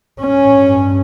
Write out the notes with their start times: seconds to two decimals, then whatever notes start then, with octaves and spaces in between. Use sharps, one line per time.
0.22 G2 C#4